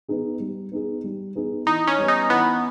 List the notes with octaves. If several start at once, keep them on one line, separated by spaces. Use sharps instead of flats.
B3 D#4 G#4
G3
B3 D#4 G#4
G3
B3 D#4 G#4
E3 D#4
C#4
G3 B3
D#4
E3 B3